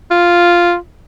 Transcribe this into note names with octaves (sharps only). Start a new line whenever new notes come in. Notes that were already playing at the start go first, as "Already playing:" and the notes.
F4